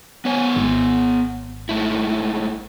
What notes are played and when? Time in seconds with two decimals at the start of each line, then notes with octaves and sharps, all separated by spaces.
0.25 B3 C#5 G#5
0.56 G#1
1.69 G#2 A3 E4